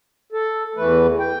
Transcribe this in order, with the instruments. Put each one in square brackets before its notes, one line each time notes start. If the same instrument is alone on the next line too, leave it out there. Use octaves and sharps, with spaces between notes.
[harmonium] A4
E2 E3 A3 B4
G5